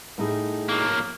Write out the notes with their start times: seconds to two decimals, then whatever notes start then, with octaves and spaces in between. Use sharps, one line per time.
0.18 A2 D#4 G#4
0.69 F#3 A#3